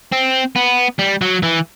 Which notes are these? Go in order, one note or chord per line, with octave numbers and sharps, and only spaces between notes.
C4
B3
G3
F#3
E3